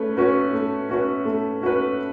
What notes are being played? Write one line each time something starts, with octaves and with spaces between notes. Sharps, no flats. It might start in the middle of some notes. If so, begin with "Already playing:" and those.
Already playing: A3 C#4 B4
C#4 F#4 B4
A3
C#4 F#4 B4
A3
C#4 F#4 B4